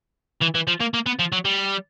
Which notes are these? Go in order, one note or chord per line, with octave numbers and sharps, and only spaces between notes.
E3
E3
F3
A#3
A#3
B3
F3
F#3
G3